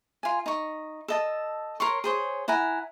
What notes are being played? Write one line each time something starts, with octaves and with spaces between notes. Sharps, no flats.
F4 G#5
D#4 C#6
A4 D#5 A5
A#4 C#5 C6 C#6
G#4 C5 C#5
E4 F#5 G#5 A#5